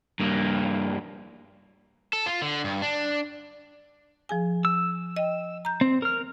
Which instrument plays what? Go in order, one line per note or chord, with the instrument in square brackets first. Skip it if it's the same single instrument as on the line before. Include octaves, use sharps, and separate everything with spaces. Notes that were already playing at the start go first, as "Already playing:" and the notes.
[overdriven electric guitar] G2 A#3
[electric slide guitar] A4
F4
D3
G2
D4
[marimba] F3 G#4 G#5
[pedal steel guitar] E6
[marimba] D#5 G5
A#5 G6
[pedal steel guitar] C4
A#4 F6